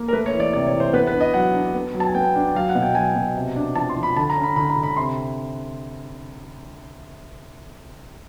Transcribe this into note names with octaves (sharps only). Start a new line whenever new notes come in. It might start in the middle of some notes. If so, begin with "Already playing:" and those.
Already playing: A#3
A#4
A3 B4
C#5
E3
D5
C3 D5
C#5
E3
C5
B3 B4
B4
D4
D#5
F#3 F#5
D4
B3
F#3
A5
G#5
B3 G5
D4
F#3 F5
F#5
B2
G5
F#3 G#5
B2
C3
D4
F3 A5
C6
F3
B5
D3 A5
A#5
C#4
B5
D3 B5
A#5
D3
B5
C3 C6